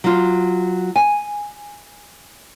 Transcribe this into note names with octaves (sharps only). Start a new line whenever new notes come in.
F#3 F4
G#5